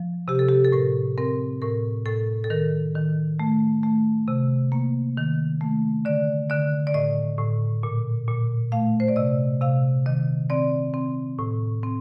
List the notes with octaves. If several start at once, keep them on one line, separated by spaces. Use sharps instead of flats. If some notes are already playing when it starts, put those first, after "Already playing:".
Already playing: F3
C3 G4
A4
G4
A4
A2 A#4
C4 A#4
A2 A#4
A2 A4
A4
D#3 A#4
D#3
A3
A3
C3
A#3
D#3
A3
D3 D5
D3 D5
D5
A2 D#5
A2
A#2
A#2
A3 F5
C5
D5
C3 D#5
C3 F5
D#3 D#5
C4 D5
C4
A2
C4